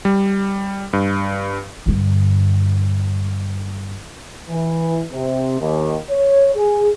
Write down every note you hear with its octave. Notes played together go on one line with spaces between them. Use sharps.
G3
G2
G2 D3
E3
C3
D#2
C#5
G#4